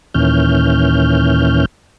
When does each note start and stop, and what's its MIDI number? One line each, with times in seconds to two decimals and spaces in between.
0.14 1.65 39
0.14 1.65 46
0.14 1.65 52
0.14 1.65 61
0.14 1.65 89
0.14 1.65 91